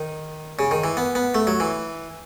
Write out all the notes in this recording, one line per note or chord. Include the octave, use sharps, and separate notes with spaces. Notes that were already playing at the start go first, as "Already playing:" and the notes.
Already playing: D#3
C#3
D#3
E3
B3
B3
A3
F#3
E3